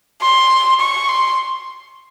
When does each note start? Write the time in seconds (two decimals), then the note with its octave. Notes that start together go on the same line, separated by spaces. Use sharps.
0.22 C6
0.80 C#6
1.09 C6